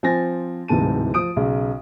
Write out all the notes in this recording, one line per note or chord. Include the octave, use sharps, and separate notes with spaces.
F3 C4 G#5 A6 A#6
D1 G#2 C3 E3 A5 D#7
F3 D#6 D7
B1 C#3